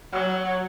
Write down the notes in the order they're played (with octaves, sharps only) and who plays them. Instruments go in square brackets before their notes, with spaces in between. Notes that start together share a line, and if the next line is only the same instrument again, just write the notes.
[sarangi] F#3